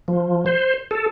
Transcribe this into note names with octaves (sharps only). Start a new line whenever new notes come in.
F3
C5
A4